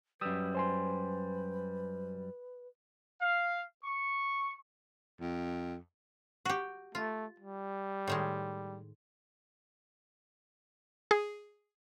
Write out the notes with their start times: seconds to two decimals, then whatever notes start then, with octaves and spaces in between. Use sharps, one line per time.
0.21 F#2 G3 B4 D#6 E6
0.55 C5 G#5 C6
3.21 F5
3.84 C#6
5.20 F2
6.45 F#4 G4
6.95 A3 F4
7.40 G3
8.08 A2 D#3 G#3
11.11 G#4